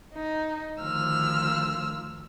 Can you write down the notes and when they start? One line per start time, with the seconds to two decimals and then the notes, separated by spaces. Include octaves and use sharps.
0.15 D#4
0.80 D2 D#3 F3 E6 F6